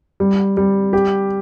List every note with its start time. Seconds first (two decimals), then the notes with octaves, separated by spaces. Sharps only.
0.20 G3
0.57 G3
0.93 G4